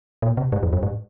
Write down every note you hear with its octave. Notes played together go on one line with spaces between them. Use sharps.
A#2
C3
G#2
F2
F#2
G#2